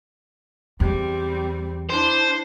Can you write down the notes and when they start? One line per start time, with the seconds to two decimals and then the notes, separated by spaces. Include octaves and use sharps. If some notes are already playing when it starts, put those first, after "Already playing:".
0.80 E2 G3 C4
1.90 D4 E4 C5